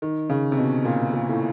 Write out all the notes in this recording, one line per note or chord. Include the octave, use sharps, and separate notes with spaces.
D#3
C#3
C3
B2
A#2
A#2
A2